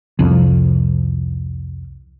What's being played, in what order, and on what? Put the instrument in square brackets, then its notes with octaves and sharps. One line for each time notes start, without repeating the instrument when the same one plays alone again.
[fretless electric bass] C2 F2